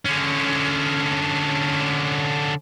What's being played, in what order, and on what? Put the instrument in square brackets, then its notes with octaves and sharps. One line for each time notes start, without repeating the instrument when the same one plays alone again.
[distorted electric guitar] D3 C#4